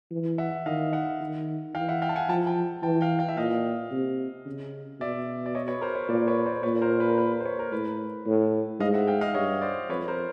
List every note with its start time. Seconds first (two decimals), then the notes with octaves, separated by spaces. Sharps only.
0.12 E3
0.38 E5 F#5
0.66 D#3 D#5 F5
0.93 E5 F#5
1.21 D#3
1.75 E3 F5 G5
1.89 E5 F#5
2.02 F5 G5
2.09 A5
2.16 F#5 G#5
2.28 F3 G5 A5
2.47 G5 A5
2.83 E3 G5 A5
3.01 F5 G5
3.19 F5 G5
3.29 E5
3.37 A#2 D#5 F5
3.92 C3
4.46 C#3
5.01 B2 D5 E5
5.46 D5
5.55 C#5 D#5
5.68 B4 C#5
5.81 A#4 C5
5.95 B4 C#5
6.09 A#2 C5 D5
6.27 B4 C#5
6.46 C5 D5
6.63 A#2 B4 C#5
6.82 A#4 C5
7.00 B4
7.09 A#4
7.18 B4
7.32 B4
7.40 C5
7.45 B4 C#5
7.59 A#4
7.72 A2 B4
8.26 A2
8.80 G#2 D#5 F5
8.94 E5 F#5
9.07 F5 G5
9.21 D#5 F5
9.34 G2 C#5 D#5
9.61 C5 D5
9.89 F2 B4 C#5
10.08 A#4 C5